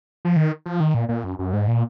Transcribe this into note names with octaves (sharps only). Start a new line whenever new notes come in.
F3
D#3
F3
D#3
A#2
A#2
F#2
F#2
G#2
A#2